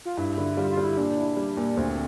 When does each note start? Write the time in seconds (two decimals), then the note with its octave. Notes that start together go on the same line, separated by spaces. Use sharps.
0.05 F4
0.17 G2 E4
0.38 D3
0.57 G3 F4
0.71 F4
0.77 G3
0.84 E4
0.97 A#2 D4
1.17 E4
1.37 G3
1.57 A#2
1.77 D2 C4